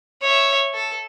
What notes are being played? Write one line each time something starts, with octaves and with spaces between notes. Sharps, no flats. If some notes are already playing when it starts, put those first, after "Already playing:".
C#5 E5
A4